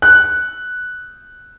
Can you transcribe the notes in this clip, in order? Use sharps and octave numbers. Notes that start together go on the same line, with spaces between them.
F#6